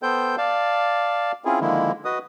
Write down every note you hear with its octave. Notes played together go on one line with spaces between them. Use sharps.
B3 A4 C5 G5 G6
D5 F5 A5
C4 C#4 E4 F4 G#4
D3 D#3 F3 G#3 A#3 E4
F#4 B4 D#5 D#6